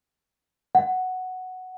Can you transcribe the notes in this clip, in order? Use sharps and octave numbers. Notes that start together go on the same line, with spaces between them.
F#5